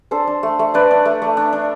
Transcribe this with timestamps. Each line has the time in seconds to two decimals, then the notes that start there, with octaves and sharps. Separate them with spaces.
0.11 D4 A4 C5
0.27 D4
0.43 A3
0.59 A3
0.74 D4 B4 D5
0.91 D4
1.05 A3
1.22 A3
1.37 D4
1.53 D4